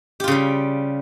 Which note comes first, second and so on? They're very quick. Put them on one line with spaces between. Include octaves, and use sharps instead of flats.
G4 F4 C#3 G3